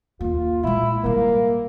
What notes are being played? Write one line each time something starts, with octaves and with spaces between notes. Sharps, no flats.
D#2 A#3 F4
A#2 G#3 E4
C3 G3 A#3